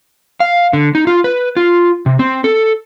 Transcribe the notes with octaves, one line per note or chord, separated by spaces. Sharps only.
F5
D3
D#4
F4
B4
F4
C3
C4
A4